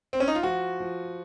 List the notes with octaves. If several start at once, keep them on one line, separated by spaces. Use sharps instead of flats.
C4
C#4
D#4
F4
F3 F#4
F3